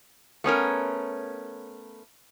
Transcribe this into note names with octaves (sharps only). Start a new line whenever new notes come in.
A3 B3 C#4 A#4